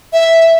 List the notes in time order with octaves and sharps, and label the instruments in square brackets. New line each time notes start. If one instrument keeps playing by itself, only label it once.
[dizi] E5